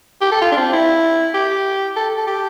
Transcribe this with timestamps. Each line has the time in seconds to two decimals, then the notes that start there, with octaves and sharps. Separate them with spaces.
0.21 G4
0.31 A4
0.42 F4
0.52 D4
0.57 C4
0.73 E4
1.34 G4
1.97 A4
2.18 A4
2.27 G4